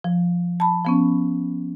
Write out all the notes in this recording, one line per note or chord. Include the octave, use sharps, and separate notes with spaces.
F3
A5 B5
F3 B3 C#4